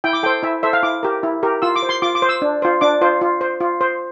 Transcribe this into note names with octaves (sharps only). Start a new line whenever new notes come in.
E4 G5
D6
A4 C5 G5
E4 E5
A4 C5 E5
F5
E4 D6
G4 A#4
E4
G4 A#4
F4 E6
D6
C5
C6
F4 D6
D6
C5
E6
D4
F4 C5
D4 D6
F4 C5
F4
C5
F4
C5